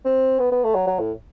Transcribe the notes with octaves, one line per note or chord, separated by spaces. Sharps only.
C4
B3
B3
A3
F#3
F#3
A2